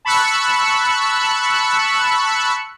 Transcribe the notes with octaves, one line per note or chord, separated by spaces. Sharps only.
A5 B5 C#6 E6 F#6 C#7